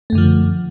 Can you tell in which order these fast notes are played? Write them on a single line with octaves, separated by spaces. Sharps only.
A3 F#2 D3 F3